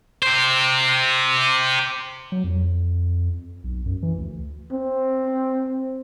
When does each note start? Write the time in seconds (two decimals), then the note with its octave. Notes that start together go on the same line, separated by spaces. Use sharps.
0.23 G4 C5
2.32 F#3
2.44 F2
3.64 B1
3.86 F#2
4.03 E3
4.18 D2
4.72 C4